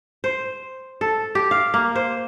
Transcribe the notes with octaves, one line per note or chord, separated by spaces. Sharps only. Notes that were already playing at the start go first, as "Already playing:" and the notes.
C5
A4
G4
F5
A#3
C5